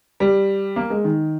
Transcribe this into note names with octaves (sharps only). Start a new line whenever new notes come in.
G3
A#3
G#3
D#3